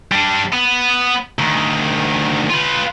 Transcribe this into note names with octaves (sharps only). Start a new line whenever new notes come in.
G3 D4
B3
D2 D#3
F4 B4